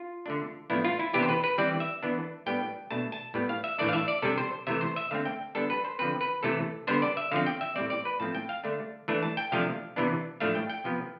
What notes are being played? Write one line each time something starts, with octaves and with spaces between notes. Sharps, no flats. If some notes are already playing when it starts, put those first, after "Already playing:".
Already playing: F4
D3 A3 D4
A2 F3 B3 D4 E4
F4
E4
C3 E3 B3 D4 G4
C5
B4
B4
E3 G3 C4 D5
E5
E3 B3 D4
A2 G3 B3 D4 G5
B2 A3 D4 A5
A5
A2 G3 B3
F5
E5
A2 E3 A3 D4 D5
F5
E5
D5
C3 G3 D4 A4
C5
C3 E3 A3 E5
C5
E5
D3 A3 C4 F5
G5
D3 G3 B3 D4 A4
B4
C5
D3 F3 C4 B4
B4
C3 E3 A3 A4
D3 G3 B3 D4 C5
D5
E5
D3 F3 C4 F5
G5
E5
A2 G3 C4 D5
D5
B4
A2 F3 A3 C4 A5
G5
F5
D3 A3 D4
E3 A3 D4
A5
G5
C3 F3 A3 D4 F5
C3 E3 B3 D4
A2 F3 A3 D4 F5
G5
G5
C3 F3 B3